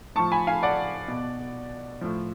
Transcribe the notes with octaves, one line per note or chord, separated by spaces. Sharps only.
A2 F3 A5 C#6
G#5 B5
F5 G#5
D5 F#5
B2
A2 F3